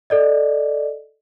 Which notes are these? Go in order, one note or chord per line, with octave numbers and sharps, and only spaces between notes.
A4 D5 D#5